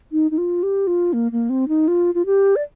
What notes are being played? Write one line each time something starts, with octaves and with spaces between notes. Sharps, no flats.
D#4
D#4
F4
G4
F4
A#3
A#3
C4
D#4
F4
F4
G4
D5